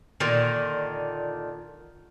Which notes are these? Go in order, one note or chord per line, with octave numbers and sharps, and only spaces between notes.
A#2 D3 D#3